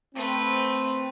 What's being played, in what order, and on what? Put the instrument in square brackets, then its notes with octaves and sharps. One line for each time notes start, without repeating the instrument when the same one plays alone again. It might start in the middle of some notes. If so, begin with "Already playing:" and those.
[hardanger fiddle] A3 B4 [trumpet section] C4